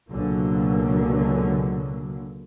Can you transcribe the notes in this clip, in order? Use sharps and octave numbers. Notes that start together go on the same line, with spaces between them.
C#2 B2 D3 F#3 A#3